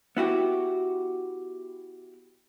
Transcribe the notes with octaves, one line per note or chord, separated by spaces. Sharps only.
B3 E4 F#4 G4